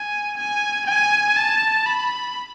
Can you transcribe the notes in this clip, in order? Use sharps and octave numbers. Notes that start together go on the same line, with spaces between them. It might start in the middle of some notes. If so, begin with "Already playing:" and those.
Already playing: G#5
G#5
G#5
A5
B5